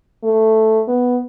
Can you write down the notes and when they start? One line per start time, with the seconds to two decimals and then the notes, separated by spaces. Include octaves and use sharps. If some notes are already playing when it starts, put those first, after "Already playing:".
0.23 A3
0.87 B3